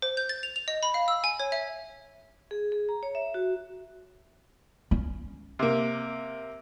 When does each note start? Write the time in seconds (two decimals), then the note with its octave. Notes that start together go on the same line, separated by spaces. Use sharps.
0.02 C5
0.17 G6
0.29 A6
0.43 F7
0.56 F7
0.68 D#5
0.83 B5
0.94 F5
1.08 E6
1.24 G#5
1.40 C#5
1.52 E5
2.51 G#4
2.72 G#4
2.89 A#5
3.03 C#5
3.15 E5
3.34 F#4
4.91 C#4
5.59 C3 A#3